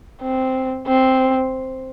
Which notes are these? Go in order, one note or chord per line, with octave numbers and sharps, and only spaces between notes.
C4
C4